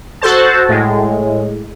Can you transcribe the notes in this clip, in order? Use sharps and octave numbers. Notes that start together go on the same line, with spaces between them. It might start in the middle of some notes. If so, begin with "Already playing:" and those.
F#4 A4 C5 A5
A2 G#3